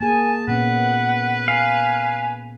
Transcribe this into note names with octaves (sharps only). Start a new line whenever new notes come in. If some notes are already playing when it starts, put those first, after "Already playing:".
A#3 G#4 G#5 A5
A#2 B3 C#4 B4 F#5
F5 G#5